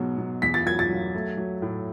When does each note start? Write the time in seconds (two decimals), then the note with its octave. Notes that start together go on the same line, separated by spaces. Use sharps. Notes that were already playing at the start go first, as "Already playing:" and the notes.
Already playing: G#2 B2 F#3
0.18 B2
0.42 E2 B6
0.54 A6
0.66 F#3 G#6
0.79 A6
0.89 F#3
1.14 A3
1.37 F#3
1.62 A2